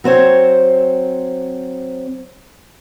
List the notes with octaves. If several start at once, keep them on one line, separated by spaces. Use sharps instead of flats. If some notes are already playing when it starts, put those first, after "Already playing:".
F#3 C4 C5 C#5